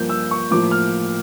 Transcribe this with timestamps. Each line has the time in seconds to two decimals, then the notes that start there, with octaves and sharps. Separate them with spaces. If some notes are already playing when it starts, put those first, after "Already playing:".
Already playing: G2 F3 A#3 G6
0.09 E6
0.31 C#6
0.51 A2 F3 A#3 D6
0.71 F6